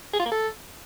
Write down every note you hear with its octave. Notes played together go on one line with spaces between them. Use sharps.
G#4
F4
A#3
A4